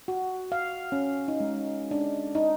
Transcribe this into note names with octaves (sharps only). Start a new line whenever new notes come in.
F#4
F5
C#4
D#4
G#3
D4
D#4